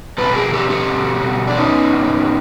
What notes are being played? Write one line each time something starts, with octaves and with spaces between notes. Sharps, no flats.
B2 A4 B4
G#4 A#4
A3 G4 A4
G4 A4
B2
B2
D4
B3 C#4 D#4
A2